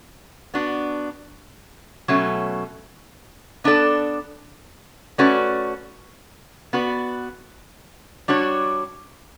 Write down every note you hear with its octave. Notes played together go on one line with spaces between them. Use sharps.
B3 D4 F#4
B2 F#3 A3 C#4
B3 D4 A4 D5
A3 C#4 F#4 B4 D5
B3 F#4 B4 D5
G3 D4 F#4 C#5